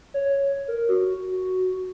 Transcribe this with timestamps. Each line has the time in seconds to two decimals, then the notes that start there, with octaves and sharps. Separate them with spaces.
0.14 C#5
0.68 A#4
0.89 F#4